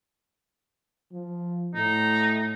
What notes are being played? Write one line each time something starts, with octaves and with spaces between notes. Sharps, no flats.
F3
A2 D#4